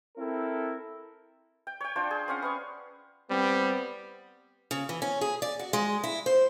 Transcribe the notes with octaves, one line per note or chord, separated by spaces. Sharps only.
C4 E4 A4 A#4
G5
C#5 G5
D4 F4 C5
G#4
C4 C#4 F5 F#5
B3 F5 C#6
G3 B3 C4
C#3
E3
C#4
G#4
D5
F#4
G#3
E4
C5